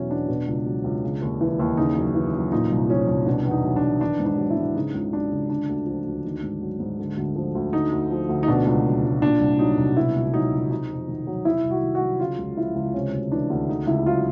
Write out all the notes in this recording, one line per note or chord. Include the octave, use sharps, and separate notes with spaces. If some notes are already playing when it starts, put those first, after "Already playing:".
Already playing: E2 B2 F#3 C#4 E4
E2 D4
B2
C#2
F#3
C#2
C#3
D#2
E3
D#2
C#3 D#4
F#2
E3
F#2
A#2 D#4
C2
F3 C#4
C2
B2 D4
E2
D#4
F#3
D4
E2
D#3 D4
G#2
D4
F#3
E4
G#2
C#3 D#4
C#2
F#3 D4
C#2
D3 D4
D2
F3
D2
D#3
G#2
F#3
G#2
D3
D2
F3
D2
D3 D#4
D2
F3
D2
D#4
B2 D4
C#2
F#3
C#2
A#2 D4
C2
F#3 D#4
C2
B2 E4
C#2
F#3 D#4
C#2
C3 D#4
F2
D#3
F#3
C3 E4
C2
F#4
D#3
F#4
F#3
C#3 F4
C#2
F3 E4
C#2
C3 C#4
D2
E3 D4
D2
C#3 D#4
C#2 E4
F#3 F4